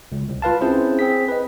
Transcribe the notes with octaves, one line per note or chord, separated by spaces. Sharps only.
C#2
C2
F4 B4 F5 A5
C4 C#4 E4 G#4 C5
C4 G#4 B6
B4 D#5